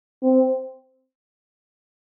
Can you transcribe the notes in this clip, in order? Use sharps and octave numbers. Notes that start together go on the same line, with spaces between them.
C4